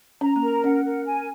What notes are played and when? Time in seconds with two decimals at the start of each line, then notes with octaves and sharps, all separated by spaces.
0.21 C#4 A#5
0.36 A#3
0.42 A#4
0.64 C#4 F#5
0.85 A#4
1.07 G#5